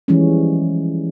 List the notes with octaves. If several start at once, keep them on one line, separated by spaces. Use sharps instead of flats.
E3 F3 G3 G#3 C#4